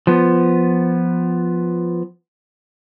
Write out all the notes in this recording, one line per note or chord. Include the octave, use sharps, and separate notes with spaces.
F3 B3